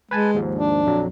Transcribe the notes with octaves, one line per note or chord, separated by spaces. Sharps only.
G#3 B4 G#5 A5
D#2 G#2 F3
D4
A#1 F2 F#3